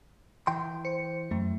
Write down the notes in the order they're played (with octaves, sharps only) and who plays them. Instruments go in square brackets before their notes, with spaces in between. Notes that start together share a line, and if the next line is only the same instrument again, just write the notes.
[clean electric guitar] E3 G5 C6
[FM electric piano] C5 C#7
[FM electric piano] F#2 [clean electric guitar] A3